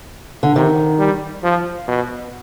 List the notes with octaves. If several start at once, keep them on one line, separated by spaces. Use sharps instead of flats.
D3
C3 D#3
G3
F3
B2